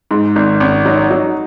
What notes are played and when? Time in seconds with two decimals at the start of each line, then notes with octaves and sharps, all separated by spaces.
0.11 G#2 D#4
0.36 G#1 D#4
0.60 G#1 C#4
0.85 F#3 D#4
1.10 F#3 D#4 F#4